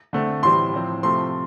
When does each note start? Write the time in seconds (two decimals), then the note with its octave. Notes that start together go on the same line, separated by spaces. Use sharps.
0.13 D3 A3 C4
0.42 A2 E3 G3 C4 C6
0.73 A2 F3 C4
1.03 C3 F3 A3 C4 C6